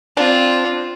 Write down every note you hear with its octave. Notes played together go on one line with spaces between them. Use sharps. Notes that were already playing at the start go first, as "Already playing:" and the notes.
C4 D4 F4